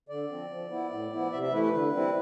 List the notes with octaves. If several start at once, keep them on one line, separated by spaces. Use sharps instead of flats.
D3 D5
F3 C4
F3
B3 E4
A2
F3 B3 E4
C3 E5
E5
E3 A3 E4 B4
B4
D3
G3 C4 E4